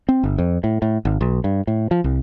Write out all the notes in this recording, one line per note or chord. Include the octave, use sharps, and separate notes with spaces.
C4
G1
F2
A2
A2
G#1
B1
G2
A2
F3
C2